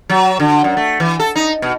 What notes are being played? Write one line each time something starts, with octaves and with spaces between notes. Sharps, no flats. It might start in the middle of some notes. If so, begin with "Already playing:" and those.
F#3
D3
F#2
A3
E3
A4
D#4
B2